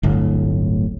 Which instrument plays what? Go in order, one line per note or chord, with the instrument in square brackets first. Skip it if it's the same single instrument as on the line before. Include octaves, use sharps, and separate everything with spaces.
[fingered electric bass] D1 G1 A2